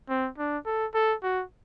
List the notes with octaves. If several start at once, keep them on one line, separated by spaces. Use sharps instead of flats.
C4
D4
A4
A4
F#4